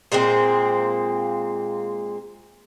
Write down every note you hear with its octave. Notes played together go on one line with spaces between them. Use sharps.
A#2 G#3 A#3 C4